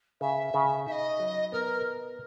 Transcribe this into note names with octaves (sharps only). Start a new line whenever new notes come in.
C#3 E5
C#3
D#4 D#5 E5
F#3
B3 A#4